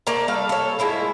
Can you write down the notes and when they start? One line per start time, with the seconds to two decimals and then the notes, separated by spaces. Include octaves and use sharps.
0.07 A3 A#3 D5 A#5
0.28 G3 A4 F5
0.49 A4 C#5
0.79 G#3 A#3 E4 F4